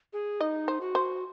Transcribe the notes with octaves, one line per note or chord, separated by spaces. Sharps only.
G#4
D#4 D#5
C5
F#4
C5